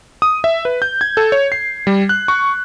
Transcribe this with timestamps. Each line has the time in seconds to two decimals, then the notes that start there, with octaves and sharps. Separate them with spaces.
0.22 D#6
0.44 E5
0.65 B4
0.82 G6
1.01 G#6
1.17 A4
1.32 C#5
1.52 C7
1.87 G3
2.09 F#6
2.28 C#6